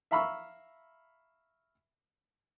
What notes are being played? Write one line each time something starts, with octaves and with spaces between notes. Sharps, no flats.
E5 F5 A#5 B5 C#6 E6